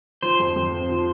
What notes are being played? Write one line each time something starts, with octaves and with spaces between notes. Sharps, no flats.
F3 C5
F2
F2
C4
F3